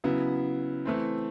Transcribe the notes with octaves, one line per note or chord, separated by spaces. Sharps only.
C#3 F#3 B3 E4
E3 A3 C4